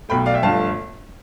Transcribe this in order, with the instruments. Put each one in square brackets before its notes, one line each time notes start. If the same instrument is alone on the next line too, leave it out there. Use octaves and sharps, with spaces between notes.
[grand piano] B1 B2 A3 G5 B5
D5 F5
E5 G5
G1 G2 F3 A3 F5 A5